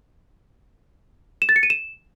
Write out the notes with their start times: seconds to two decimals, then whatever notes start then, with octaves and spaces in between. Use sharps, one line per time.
1.42 E7
1.49 A6
1.56 C#7
1.63 D#7
1.70 E7